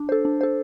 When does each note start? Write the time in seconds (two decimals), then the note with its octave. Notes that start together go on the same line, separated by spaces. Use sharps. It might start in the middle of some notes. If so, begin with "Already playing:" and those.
Already playing: D4
0.09 A4 C5
0.25 D4
0.41 A4 C5